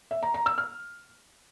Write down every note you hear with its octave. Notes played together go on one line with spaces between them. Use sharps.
E5
A#5
A#5
E6
F6